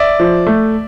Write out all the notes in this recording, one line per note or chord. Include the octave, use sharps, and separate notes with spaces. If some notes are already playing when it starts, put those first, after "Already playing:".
Already playing: D5 E5
F3
A3